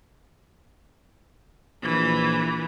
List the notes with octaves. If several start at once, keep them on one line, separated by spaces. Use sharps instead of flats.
A#1 E3